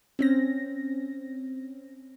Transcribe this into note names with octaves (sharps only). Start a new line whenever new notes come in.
C4 C#4 A#6